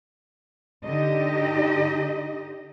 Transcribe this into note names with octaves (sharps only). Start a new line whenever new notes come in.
D3 D#4 G4 D#5